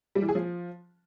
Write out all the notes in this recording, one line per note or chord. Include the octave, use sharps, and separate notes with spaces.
G3
E3
G#4
F3